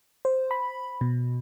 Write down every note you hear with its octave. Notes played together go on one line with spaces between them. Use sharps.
C5
B5
B2